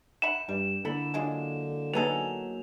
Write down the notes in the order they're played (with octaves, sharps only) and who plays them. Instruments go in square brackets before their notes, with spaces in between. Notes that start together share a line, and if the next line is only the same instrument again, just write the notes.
[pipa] E5 F#5 B5 [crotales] E7
[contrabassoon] G2 [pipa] G3
[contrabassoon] D3 [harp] A#3 E4 [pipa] A4 B5
[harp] F#3 [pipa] G#3 D4 F4
[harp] F#3 A#3 G#4 [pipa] B3 D#4 A4 [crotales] F7